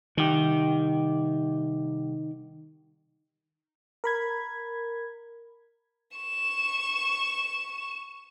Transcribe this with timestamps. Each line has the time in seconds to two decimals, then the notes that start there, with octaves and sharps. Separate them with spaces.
0.17 C2 D#3 G4
4.04 A#4 B5 G#6
6.17 C#6 E7